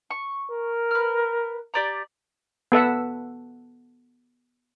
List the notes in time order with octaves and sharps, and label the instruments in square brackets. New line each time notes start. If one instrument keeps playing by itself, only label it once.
[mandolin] C#6
[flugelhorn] A#4
[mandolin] B4 F6
G4 D5 A#5
[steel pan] B3 A4 E5 F#5